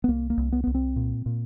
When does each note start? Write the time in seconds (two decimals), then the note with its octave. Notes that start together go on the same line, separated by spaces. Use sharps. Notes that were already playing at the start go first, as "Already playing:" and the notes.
0.04 B3
0.08 C2 A#3
0.30 A#3
0.37 C2
0.52 B3
0.64 C2 B3
0.75 C4
0.96 A#2
1.26 A#2